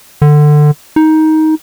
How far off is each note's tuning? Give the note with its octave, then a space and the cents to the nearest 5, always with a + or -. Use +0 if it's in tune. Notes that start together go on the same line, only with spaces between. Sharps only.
D3 +20
D#4 +15